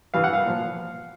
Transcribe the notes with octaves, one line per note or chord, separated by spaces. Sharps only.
G2 E3 G3 F5
F#5
F5
A#2 F3